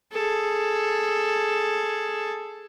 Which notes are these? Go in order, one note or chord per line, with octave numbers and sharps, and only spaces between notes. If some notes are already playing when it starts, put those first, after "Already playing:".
G#4 A4